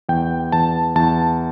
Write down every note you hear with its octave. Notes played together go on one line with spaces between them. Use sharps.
E2 G5
E2 A5
E2 A5